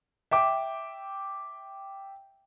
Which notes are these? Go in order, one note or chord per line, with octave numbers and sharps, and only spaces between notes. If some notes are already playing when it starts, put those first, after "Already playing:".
E5 G5 D6